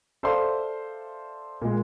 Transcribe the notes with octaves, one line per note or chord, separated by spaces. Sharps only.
A4 C5 D5 E5 F5 C6
A#2 G#3